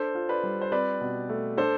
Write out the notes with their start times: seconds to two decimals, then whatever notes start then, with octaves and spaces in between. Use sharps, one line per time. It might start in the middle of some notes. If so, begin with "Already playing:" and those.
Already playing: D4 A4 C5
0.15 F4
0.29 B4 D5
0.43 G3
0.61 C5
0.72 C4 B4 D5
1.01 B2
1.29 A3
1.57 D4 A4 C5